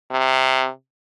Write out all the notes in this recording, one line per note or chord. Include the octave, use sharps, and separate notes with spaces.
C3